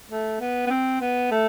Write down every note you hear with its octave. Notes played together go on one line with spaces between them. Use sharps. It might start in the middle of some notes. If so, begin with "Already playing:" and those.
A3
B3
B3
C4
B3
A3